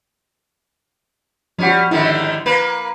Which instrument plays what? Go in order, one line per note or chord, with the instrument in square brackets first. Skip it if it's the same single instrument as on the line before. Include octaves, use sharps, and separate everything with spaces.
[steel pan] F3 F#4 [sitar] G3 C#4
[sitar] G#2 D3 D#3 [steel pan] E4
[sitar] A#3 B4